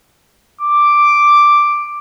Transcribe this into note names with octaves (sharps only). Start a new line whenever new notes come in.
D6